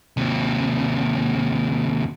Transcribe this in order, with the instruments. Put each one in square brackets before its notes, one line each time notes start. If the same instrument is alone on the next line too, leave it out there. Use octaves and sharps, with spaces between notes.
[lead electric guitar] D#2 C3